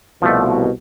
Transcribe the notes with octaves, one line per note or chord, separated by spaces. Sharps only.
C2 B2 F3 A3